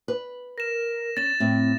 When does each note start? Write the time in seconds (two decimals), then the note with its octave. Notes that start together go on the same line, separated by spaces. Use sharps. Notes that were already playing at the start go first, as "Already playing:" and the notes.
0.08 B4
0.58 A#4 A#6 E7
1.17 C#4 A6 E7
1.40 A2 C4